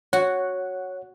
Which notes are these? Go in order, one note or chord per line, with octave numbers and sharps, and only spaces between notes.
F#4 C#5 F#5